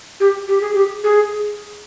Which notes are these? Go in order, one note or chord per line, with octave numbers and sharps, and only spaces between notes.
G4
G4
G#4
G4
G#4